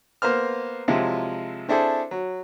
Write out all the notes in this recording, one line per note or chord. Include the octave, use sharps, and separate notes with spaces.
A#3 B3 C5 F6
C3 F3 F#3 G#3 E4 F4
C4 D4 E4 G#4 A4 C5
F#3